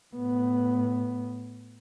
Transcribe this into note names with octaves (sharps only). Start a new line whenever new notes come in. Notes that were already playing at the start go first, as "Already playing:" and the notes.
A2 B3